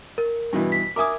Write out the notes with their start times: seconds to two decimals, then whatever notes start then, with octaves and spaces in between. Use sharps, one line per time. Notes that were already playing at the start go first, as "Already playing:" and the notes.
0.18 A#4
0.53 G2 B2 E3
0.72 B6
0.96 A#4 E5 G#5 D6 D#6